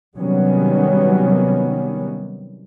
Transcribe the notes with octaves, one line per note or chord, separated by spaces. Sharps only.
C3 D#3 F#3 G3 B3 C#4